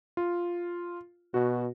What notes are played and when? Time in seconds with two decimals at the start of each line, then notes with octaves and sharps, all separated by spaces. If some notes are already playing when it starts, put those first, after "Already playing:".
0.17 F4
1.34 B2 F#4